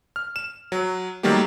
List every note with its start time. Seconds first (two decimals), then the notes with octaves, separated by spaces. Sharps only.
0.16 F6
0.36 E7
0.72 F#3
1.23 D#3 F#3 G3 A3 A#3 G4